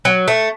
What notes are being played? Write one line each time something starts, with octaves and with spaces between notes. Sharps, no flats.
F#3
A3